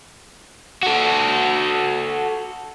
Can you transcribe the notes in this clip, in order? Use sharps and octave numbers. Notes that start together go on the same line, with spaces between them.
F#4 A4